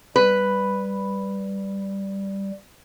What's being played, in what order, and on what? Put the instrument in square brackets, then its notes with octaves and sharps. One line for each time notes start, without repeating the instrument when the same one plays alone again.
[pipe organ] G3 [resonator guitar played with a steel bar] B4